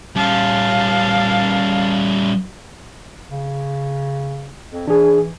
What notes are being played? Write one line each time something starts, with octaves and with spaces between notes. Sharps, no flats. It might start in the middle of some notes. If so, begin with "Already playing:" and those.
G3 C#4 F5 A5
C#3
F2
E3 D4 G#4